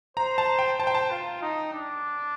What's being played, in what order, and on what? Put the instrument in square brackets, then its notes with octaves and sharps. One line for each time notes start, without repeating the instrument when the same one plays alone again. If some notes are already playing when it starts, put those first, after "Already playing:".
[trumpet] C5 [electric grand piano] A#5
[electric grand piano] A5
G5
[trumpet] C5 [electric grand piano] A5
[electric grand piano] G5
A5
[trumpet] F4
D#4
D4